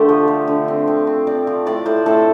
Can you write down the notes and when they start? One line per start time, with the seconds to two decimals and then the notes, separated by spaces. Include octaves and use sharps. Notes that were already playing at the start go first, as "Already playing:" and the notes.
Already playing: D3 A3 G4 A4 C5
0.09 F3
0.28 F3
0.47 D3
0.68 C4
0.87 C4
1.07 C4
1.27 C4 D5
1.47 F3
1.66 A2 D5
1.86 A2 C5
2.06 A2 A4